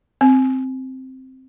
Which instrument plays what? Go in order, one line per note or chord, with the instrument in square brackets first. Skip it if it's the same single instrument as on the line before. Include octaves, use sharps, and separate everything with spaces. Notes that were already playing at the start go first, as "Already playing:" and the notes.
[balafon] C4